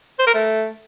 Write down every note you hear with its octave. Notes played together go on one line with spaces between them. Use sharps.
C5
A#4
A3